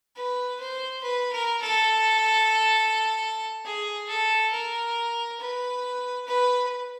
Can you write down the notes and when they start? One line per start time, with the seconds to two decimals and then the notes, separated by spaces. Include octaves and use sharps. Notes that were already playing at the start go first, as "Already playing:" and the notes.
0.16 B4
0.60 C5
1.03 B4
1.32 A#4
1.62 A4
3.65 G#4
4.09 A4
4.52 A#4
5.39 B4
6.27 B4